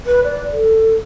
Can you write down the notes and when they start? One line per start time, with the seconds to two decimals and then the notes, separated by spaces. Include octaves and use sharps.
0.06 B4
0.23 D5
0.51 A4